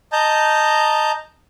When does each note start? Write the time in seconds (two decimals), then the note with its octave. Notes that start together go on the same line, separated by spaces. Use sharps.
0.13 D#5 A5 A#5 G6